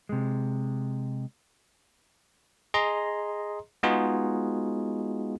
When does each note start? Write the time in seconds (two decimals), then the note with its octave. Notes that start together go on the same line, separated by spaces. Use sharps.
0.09 C3 G#3
2.74 G#4 D#5 A#5 C6
3.83 G#3 B3 D#4 F4 F#4 G#4